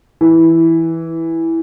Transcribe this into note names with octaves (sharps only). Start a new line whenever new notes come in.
E3